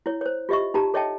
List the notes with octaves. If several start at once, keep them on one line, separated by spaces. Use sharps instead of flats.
E4 C#5
C5 C#5
F4 G4 D#5 E5 C#6
D#4 F4 G4 A5 A#5
A4 C#5 D#5 E5 G5 A5